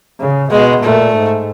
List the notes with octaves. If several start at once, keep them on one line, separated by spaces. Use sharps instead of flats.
C#3
B2 G#3
A#2 A3
G#2